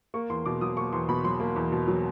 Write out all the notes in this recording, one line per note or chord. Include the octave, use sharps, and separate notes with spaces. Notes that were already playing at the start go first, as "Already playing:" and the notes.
A#3 C#6
E2 C6
B2 D6
F#3 D#6
A#3 C#6
E2 C6
B2 B5
F#3 C6
A#3
E2
B2
F#3